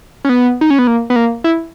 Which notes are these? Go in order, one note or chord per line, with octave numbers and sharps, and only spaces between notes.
C#4
B3
D#4
C#4
B3
A#3
B3
A#3
E4